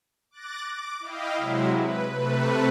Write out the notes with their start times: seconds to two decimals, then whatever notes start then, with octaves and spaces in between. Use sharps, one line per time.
0.31 D6 F#6 A6 A#6
0.70 D6
1.00 E4 D#5 F5 G5
1.37 C3 F#3 G#3 E4
1.73 B4
2.10 C3 A3 B4